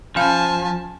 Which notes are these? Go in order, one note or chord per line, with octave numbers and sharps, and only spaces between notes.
F3 C#4 F5 G#5 A5 B5